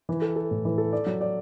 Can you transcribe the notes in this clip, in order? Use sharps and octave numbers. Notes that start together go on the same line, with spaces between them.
E3
A4
A4
A2
E3
A4
D5
F#3
D5